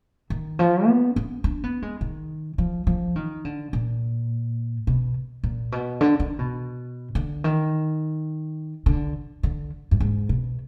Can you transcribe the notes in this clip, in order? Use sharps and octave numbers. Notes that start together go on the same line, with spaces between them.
D#3
F3
B3
B3
D4
B3
G#3
D#3
F3
F3
D#3
D3
A#2
B2
A#2
B2
D3
D#3
B2
D3
D#3
D3
D3
F#2
G#2
B2